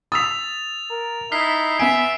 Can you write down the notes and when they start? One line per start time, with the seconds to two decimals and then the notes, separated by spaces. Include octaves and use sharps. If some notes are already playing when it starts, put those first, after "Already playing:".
0.12 D#6 E6 A6 B6 F7
0.90 A#4
1.32 D#4 E4 F6 B6 C7
1.80 B3 E5 G#5 D7